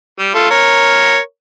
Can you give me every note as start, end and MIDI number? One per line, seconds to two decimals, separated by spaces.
0.19 0.32 55
0.34 0.47 57
0.34 0.47 65
0.51 1.18 70
0.51 1.18 73